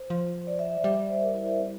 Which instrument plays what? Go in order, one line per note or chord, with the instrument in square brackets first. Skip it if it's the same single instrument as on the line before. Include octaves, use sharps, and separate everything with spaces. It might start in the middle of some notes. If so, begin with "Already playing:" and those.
Already playing: [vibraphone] C5
[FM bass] F3
[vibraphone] D5
E5
E5
[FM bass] G3 [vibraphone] E5
[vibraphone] D5
C5
A#4
E4
E4
C4